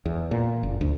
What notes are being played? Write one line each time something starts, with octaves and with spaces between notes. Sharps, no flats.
E2
A#2
F#1
D2